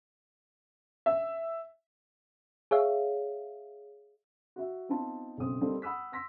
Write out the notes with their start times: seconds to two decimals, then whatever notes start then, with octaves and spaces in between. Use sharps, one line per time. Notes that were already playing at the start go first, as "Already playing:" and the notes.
1.06 E5
2.71 G#4 C#5 E5 F5
4.56 F#4 E5
4.89 B3 C4 D#4 F4 A5
5.38 B1 F#2 C#3 C4 D#6
5.61 G3 A#3 C4 D#4 A4
5.82 F#5 B5 D#6 E6 B6
6.12 C6 E6 A#6 B6